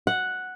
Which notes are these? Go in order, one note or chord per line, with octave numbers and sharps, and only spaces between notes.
F#5